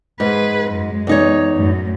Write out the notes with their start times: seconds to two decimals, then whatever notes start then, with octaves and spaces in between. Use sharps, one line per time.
0.20 G#2 G#4 B4
0.68 F#2 G#3
1.07 E2 D#4 C#5
1.55 F#2 A2